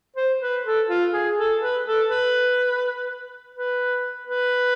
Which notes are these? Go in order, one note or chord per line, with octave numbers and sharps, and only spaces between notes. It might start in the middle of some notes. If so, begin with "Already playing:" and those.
C5
B4
A4
F4
G#4
A4
B4
A4
B4
B4
B4